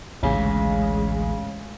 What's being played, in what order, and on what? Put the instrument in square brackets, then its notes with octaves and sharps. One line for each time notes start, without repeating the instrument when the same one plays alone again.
[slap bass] A1 D2 G#2 [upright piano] C#3 [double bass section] G#3